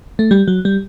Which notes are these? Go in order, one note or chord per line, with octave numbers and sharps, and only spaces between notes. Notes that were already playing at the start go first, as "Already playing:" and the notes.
A3
G3
F#3
G3